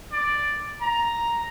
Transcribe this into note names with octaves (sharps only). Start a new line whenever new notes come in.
D5
A#5